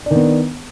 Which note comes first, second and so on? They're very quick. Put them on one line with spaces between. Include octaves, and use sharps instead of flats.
D4 D#3 B3